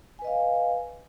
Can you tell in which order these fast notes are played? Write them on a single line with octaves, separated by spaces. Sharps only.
G#5 B4 D#5 F5